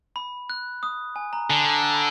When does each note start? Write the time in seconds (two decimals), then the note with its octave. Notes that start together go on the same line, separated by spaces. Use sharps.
0.16 B5
0.50 F#6
0.83 D#6
1.16 G#5
1.33 A#5
1.50 D3 G#5
1.73 A#5
1.94 B5